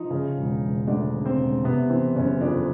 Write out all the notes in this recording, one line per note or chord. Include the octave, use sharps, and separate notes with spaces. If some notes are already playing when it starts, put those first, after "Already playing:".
Already playing: F3 D#4
C#3
E1
E1
D2 D4
C#3
C4
E1
C3 B3
E3 C4
F#1 C#4
F2 D4